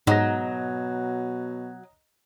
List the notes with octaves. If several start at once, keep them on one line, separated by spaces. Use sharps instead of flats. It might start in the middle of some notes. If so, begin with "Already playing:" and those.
G#2 B2 F#3 D#5 A#5 A#6